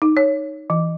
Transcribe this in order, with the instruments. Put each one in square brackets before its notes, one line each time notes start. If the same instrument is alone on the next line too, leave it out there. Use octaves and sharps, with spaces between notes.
[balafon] D#4
C#5
E3